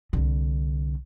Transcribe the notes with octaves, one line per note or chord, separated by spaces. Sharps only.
C2 D3